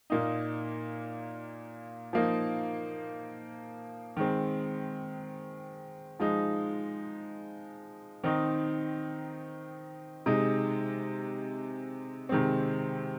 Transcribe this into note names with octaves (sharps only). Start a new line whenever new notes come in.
A#2 A#3 D#4
F3 A#3 D#4
D#3 G#3 C4
F3 G#3 D#4
D#3 C4 D#4
C3 G#3 D#4
C3 D#3 G#3 C4